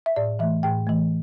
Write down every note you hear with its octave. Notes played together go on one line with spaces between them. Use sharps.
E5
A2 D5
E3 A3 E5
A2 G5
E3 A3